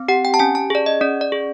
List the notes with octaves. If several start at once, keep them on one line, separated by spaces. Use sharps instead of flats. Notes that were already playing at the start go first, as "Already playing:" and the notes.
Already playing: C4
G4 F#5
G5
A5
C#4 G#5
A5
G#4 D5
D#5
C#4 D5
D5
G#4